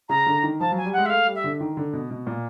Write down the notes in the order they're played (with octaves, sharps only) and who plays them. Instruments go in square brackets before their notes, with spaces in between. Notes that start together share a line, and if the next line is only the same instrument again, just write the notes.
[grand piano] C#3 [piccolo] A#5
[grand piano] D3
D#3
[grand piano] F3 [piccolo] A5
[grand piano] F#3
[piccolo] G#5
[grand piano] G3
[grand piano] G#3 [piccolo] F#5
[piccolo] E5
[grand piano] A3 [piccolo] F5
[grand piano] G3
[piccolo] E5
[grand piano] D3
D#3
D3
B2
B2
A#2